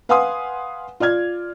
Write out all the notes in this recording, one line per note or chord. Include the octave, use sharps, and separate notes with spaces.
B4 F5 F#5 G#5 C6 D#6
F4 D5 F6 G#6